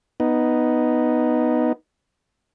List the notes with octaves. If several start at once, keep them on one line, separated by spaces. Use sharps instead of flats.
B3 D#4